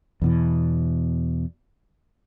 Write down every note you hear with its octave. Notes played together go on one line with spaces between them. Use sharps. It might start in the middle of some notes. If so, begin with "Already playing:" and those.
E2 B2 E3